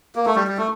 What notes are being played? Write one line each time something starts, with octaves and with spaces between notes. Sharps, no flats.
A#3
A3
G3
G3
A3